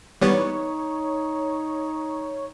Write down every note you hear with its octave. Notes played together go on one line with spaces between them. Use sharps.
E3 G3 B3 D#4 C#5